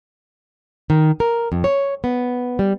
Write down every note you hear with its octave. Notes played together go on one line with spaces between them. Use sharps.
D#3
A#4
F2
C#5
B3
G3